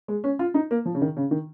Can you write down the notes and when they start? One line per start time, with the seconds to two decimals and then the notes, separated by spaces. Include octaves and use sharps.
0.08 G#3
0.24 C#4
0.39 F4
0.54 D#4
0.71 A#3
0.85 F3
0.95 C#3
1.02 D#3
1.17 C#3
1.31 D#3